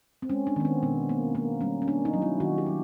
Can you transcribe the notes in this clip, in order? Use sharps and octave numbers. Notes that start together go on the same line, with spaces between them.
C4
G#3 C#4
D4
D#3 B3
C4
B2 B3
A#3
A#3 B3
G3 C#4
C#4
A#3 D4
D#4
F#3
E4
D#3 F#4
G4
F#3